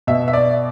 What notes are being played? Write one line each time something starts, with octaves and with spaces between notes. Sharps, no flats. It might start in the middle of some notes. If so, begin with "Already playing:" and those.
B2 E5
E5
D5